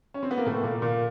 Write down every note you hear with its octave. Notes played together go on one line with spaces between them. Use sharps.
C#4
C4
B3
A#3
A2 A3
A#2 A#3
A#2 A#3